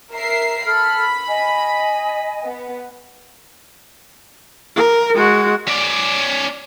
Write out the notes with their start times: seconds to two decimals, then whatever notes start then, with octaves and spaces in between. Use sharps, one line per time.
0.12 A#4 E5 C7
0.65 A4 B5 F6
1.28 D#5 G#5
2.44 B3
4.76 A#4
5.15 G#3 F#4
5.68 C#4 D5